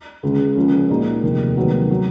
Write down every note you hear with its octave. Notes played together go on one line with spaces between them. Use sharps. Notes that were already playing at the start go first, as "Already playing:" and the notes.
C#2 C#3 G#3
C#2 C#3 F3 A#3 C#4
A#2 G#3 D#4 F#4
F1 D#2 D#3
F1 D#2 D#3 F#3 B3
F#3